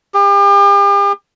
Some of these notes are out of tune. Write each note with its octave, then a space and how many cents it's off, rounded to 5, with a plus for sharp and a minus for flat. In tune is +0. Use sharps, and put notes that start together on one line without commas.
G4 +40